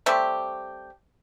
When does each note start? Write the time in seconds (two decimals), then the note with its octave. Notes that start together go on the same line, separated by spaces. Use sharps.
0.06 G3 A3 C4 G4